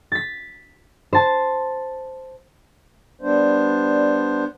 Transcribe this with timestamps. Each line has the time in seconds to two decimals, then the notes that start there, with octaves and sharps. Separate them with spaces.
0.12 A6 B6
1.13 C5 A5
3.22 G3 B3 D4 C5